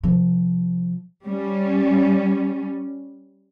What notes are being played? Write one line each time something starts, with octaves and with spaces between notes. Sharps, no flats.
C3 F3
G3 C#4